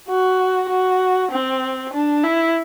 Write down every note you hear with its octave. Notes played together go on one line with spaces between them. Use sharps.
F#4
F#4
C4
D4
E4